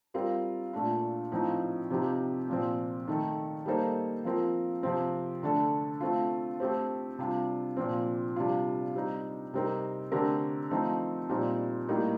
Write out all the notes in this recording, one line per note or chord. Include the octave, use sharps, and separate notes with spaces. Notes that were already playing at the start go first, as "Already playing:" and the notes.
G3 C4 F4 A#4
A#2 A3 D4 F4
A2 F3 C4 D#4
C3 F3 C4 D#4 G4
A#2 F3 C4
D#3 A3 D#4 A4
G3 A#3 D#4 A4 C5
F3 C4 F4 A#4
C3 F3 C4
D3 A3 D4 A4
A3 C4 F4
A3 C4 G4 C5
C3 G3 D4 F4
A#2 F3 C4
C3 G3 D4 F4
G3 C4 D#4
C3 G3 C4 D#4 A#4
D3 A3 C4 G4 A#4
F3 A3 C4 D#4
A#2 G3 C4 D#4
A2 G3 A#3 D#4